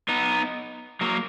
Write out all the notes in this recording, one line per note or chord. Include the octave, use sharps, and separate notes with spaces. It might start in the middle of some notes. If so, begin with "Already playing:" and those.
B3 D#4
F#3 A#3